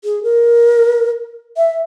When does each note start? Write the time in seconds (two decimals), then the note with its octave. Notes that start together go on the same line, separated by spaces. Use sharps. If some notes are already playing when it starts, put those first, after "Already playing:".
0.04 G#4
0.23 A#4
1.57 E5